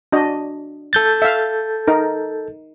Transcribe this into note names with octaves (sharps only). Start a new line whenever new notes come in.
D4 F#4 D#5
A4 G6 A6
E5 F5
D#4 A#4